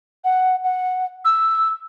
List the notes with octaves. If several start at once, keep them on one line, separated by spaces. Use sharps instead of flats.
F#5
F#5
E6